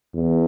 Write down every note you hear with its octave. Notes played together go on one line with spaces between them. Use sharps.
E2